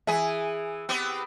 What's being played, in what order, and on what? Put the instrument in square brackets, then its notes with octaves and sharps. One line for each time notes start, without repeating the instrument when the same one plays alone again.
[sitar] E3 G#4 [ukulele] E5 G#5
[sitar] B3 C4 G4